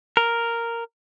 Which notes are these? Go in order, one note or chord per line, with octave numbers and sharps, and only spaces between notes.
A#4